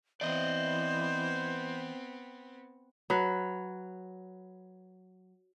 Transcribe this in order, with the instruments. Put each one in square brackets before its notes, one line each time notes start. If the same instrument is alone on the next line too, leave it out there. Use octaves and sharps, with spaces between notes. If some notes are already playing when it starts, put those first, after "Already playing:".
[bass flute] E3 [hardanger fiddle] B3 C4 [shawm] C5 [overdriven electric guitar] D5 D#5
[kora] F#3 B4